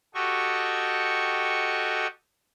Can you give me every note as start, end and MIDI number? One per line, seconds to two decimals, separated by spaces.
0.15 2.07 66
0.15 2.07 67
0.15 2.07 69
0.15 2.07 75
0.15 2.07 85